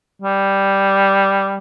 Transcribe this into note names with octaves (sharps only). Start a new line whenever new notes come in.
G3